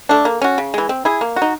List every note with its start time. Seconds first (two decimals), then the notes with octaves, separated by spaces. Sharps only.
0.09 A3 D4
0.25 A#3
0.42 C#4 F#4
0.58 C#3
0.74 E3 G#3
0.89 C4
1.05 E4 G#4
1.21 A#3
1.36 F#4
1.42 D#4